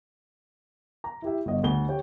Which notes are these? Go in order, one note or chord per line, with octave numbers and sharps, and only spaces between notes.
A#5
E4 G4 E5
G1 D#5
D2 F#5 G7
G4 C#5 G5